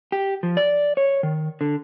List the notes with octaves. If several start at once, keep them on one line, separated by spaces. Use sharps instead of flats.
G4
F3
D5
C#5
D#3
D3